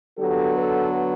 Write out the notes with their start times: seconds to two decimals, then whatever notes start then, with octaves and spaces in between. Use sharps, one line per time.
0.17 D3 F#3 B3 G4 A4
0.56 A4 B4